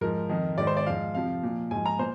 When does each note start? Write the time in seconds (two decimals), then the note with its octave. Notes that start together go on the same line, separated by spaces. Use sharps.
0.01 G#2 F3 A#4
0.29 F2 D#3
0.58 G#2 D#3 D5
0.67 C5
0.77 D5
0.86 G#2 F3 F5
1.15 F2 C3 F3 F5
1.43 A#2 F3
1.71 G#2 F3 G#5
1.86 A#5
1.99 A#2 C5